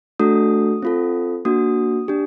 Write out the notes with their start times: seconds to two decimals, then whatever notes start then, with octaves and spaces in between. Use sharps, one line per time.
0.19 A3 D4 F#4 A4 D#6
0.83 C4 F4 A4
1.45 A#3 D4 F#4 D#6
2.08 D4 G4